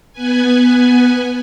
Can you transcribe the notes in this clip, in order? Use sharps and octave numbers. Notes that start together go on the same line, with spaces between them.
B3 B4 G#5